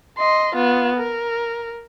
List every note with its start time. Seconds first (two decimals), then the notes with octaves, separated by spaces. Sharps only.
0.19 D#5 C6
0.55 B3 F4
0.96 A#4